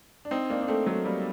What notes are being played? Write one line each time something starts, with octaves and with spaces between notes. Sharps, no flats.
D4
C4 D#4
A#3 D4
D4
A3 C4
F#3 A3
G3 A#3